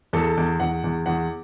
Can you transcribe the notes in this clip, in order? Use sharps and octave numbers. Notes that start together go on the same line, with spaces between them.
E2 A4
E2
E2 F#5
E2
E2 F#5